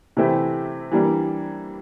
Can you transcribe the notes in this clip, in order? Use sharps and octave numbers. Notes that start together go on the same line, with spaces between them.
C3 E3 A3 C4 E4
E3 G3 A#3 D4